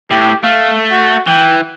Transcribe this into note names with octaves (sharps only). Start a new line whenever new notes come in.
A2 G4
A3 F5
F#4
E3 G5